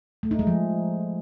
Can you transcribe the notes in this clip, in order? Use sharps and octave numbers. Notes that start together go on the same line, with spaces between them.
A3
D#4
G#3
F3